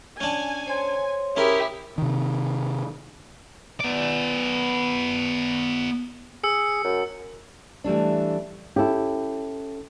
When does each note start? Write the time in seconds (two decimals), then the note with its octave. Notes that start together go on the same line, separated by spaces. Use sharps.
0.20 C#4 D4 G#5
0.66 C5 C#5 C6
1.36 C#4 E4 G4 G#4 A#4
1.98 C3 D#3
3.81 B3 D5
6.44 G#4 E6 C#7
6.84 F#2
7.84 E3 G3 A3 D4
8.76 C#4 E4 G4 A4